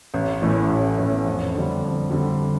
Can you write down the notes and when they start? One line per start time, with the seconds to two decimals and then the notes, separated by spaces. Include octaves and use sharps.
0.14 A1
0.42 A2 E3 A3 C#4
0.70 A1
0.98 A2 E3 A3 C#4
1.27 F2
1.55 D3 G3
1.84 F2
2.11 D3 G3